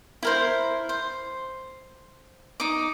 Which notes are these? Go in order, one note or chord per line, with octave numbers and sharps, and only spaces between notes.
E4 A#4 C5
C5
D#4 D6